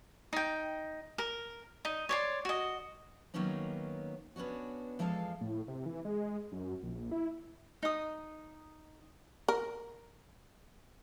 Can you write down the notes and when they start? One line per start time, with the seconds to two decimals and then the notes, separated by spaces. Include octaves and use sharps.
0.33 D#4 G5
1.18 A#4
1.85 D#4
2.09 C#5 D5 C6
2.45 F#4 D#5
3.34 D#3 F#3 A#3 B3 C#4 D#4
4.36 B3 C#4 D4 F#4
4.99 E2 F3 G#3 A4 D#5 F5
5.41 A2
5.68 C3
5.86 E3
6.05 G#3
6.52 F#2
6.83 A#1
7.11 E4
7.83 D#4 D#6
9.48 A#4